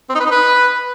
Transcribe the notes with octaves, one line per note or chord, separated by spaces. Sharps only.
C4
D#4
B4
D#4
B4